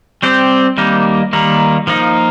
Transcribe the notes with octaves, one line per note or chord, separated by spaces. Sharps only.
G3 C4 G4 C5
D#3 G3 A#3 D#4
D#3 G3 A#3 D#4
F3 A#3 D#4